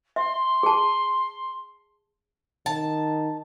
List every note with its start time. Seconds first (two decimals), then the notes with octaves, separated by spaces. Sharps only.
0.16 E5 C6
0.63 G#4 A5
2.66 D#3 A5